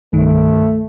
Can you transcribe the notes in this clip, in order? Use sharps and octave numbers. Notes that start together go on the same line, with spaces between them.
C2 G2 D#3 A3